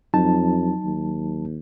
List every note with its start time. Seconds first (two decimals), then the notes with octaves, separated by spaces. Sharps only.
0.14 F2 F#3 D#4 A5
0.84 D#2